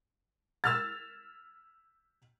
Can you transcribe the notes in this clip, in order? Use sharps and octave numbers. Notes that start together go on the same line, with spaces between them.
E6 F6 A6